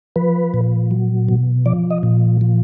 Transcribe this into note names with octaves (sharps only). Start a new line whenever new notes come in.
F3 B4
A#2
F#3
B2
F3 D5
D#5
A#2
F3